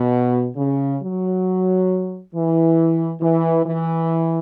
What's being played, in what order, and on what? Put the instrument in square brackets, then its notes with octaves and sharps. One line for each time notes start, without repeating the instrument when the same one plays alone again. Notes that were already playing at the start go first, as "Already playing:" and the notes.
Already playing: [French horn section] B2
C#3
F#3
E3
E3
E3